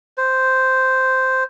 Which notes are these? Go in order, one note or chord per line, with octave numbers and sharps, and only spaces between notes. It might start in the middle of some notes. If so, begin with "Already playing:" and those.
C5